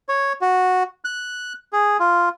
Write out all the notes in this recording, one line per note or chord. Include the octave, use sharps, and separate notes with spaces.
C#5
F#4
F#6
G#4
F4